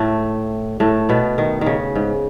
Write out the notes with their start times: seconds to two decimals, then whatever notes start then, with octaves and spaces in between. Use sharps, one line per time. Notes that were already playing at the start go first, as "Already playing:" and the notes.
Already playing: A2 A3
0.80 A2 A3
1.09 B2 B3
1.38 D#3
1.61 D#3
1.66 C#3
1.95 G#2